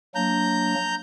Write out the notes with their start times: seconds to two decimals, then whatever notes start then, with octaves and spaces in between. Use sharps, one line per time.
0.15 F#3 A#3 D4 A#5 G6